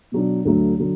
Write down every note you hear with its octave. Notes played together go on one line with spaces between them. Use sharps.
B2 F#3 D4
D2 D3 F#3 A3
D3 F#3